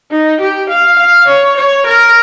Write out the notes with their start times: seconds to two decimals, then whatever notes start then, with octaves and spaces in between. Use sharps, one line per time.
0.11 D#4
0.41 G4
0.70 F5
0.99 F5
1.28 C#5
1.57 C#5
1.86 A#4